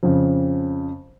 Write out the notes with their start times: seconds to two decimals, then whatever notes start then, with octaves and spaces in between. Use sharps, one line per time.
0.03 F2 C#3